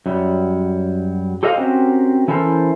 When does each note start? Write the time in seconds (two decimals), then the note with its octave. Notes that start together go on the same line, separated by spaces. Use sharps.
0.06 F#2 F#3 G3
1.43 G4 A4 C5 D#5 F5
1.57 C4 C#4 F#4 G4 A#4 C5
2.28 E3 C#4 E4 A4 A#4 C5